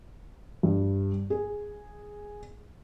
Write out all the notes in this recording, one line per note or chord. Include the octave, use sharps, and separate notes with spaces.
G2
G#4